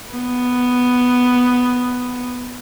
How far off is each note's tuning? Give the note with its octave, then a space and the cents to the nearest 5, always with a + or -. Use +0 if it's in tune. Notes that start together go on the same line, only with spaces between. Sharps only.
B3 +5